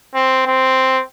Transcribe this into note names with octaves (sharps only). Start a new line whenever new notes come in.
C4
C4